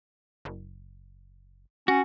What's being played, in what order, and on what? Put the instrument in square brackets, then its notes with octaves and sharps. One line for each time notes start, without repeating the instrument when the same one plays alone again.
[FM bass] F#1
[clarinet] C#4 [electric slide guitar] F#4